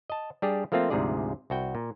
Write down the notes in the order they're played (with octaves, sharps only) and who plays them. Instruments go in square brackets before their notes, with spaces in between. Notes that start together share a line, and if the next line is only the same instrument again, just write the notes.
[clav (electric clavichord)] D#5 A5
G3 D4 G4 G#4
F3 A3 A#3 C4 F4
D2 G#2 C3 F3 G#4 D5
C2 F#4 G5
A#2